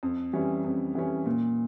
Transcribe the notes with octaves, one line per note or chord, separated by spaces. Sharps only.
F2
E3 G3 C#4
F2
E3 G3 C#4
A#2